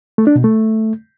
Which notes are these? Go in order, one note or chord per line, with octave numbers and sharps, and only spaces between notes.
A3
D4
B2
A3